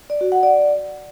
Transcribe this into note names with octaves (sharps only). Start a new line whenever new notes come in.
D5
F#4
F#5
D5